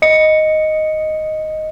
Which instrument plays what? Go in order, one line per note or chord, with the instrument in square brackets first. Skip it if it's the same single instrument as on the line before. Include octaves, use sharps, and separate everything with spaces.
[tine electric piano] D#5 C#7